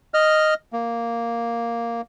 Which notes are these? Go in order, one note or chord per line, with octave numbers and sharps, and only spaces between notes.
D#5 F6
A#3